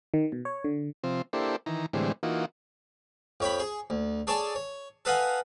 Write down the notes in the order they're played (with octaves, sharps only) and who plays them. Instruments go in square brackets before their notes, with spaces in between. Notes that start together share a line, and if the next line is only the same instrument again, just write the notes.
[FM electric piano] D#3
B2
C#5
D3
[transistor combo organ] C3 F3 C4
A#3 D4 E4 G4 A4 C5
D#3 E3 A#5
A2 D3 E3 G3 G#3 C4
E3 A#3 D#4 F4 F#4
[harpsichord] F2 C#5 G5 B5
G#4
D2
G#4 A4 C#5 D5 G#5 A5
C#5
A4 B4 D#5 F5 F#5 G#5